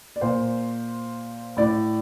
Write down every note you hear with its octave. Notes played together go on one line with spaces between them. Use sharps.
D5
A#2 C5
A2 D5